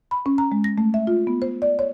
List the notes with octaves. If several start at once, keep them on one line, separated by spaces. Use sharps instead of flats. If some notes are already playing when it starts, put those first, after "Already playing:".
B5
C#4
A#5
G#3
A#6
A3
E5
F4
B3
C5
D5
C#5